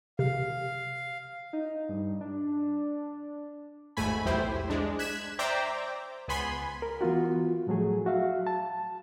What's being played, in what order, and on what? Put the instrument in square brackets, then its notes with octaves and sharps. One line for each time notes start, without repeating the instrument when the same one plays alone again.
[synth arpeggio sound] C3 [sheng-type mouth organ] F5
[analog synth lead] D#4
G2
D4
[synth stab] G#1 D#2 G#2 A3 G#5 B5
B1 E2 A2 E4 G4 C5
G#3 D4
F#6 G#6 B6 E7
C5 D5 E5 G5 A#5 D6
C#2 B3 G#5 B5 C6
[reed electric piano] A#4
E3 B3 F4 F#4
A2 F3 F#3 A3 G#4
F#4 E5 F5
A5